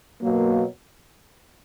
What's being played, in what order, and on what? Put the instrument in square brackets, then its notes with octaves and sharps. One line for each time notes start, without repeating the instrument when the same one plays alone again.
[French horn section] B2 F#3 A#3